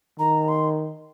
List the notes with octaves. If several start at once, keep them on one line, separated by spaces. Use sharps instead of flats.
D#3 A#5
C6